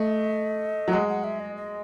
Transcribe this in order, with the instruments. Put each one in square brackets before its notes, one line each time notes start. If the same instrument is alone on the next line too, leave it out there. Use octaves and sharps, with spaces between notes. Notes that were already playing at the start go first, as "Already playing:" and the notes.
Already playing: [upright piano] A3 [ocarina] D#5
[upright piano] F#3
[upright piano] G#3 [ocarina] F#5
[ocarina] F#5
E5
D#5
D#5